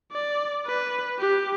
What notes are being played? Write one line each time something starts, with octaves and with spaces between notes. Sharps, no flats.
D5
B4
G4